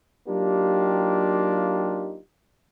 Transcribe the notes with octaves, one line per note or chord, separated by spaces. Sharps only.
F#3 A#3 D4 D#4 F4 G4